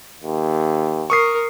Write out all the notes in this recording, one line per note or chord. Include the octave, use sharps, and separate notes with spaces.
D#2
A#4 C#6 D#6 C7